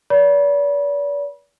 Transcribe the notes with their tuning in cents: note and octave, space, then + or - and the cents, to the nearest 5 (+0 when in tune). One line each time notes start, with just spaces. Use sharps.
B4 -35 D5 -40 B5 -30